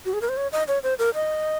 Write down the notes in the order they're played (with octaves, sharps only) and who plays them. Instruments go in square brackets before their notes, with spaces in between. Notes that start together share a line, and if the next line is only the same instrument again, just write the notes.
[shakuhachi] F#4
G#4
A#4
C5
C#5
D#5
C#5
C5
A#4
D#5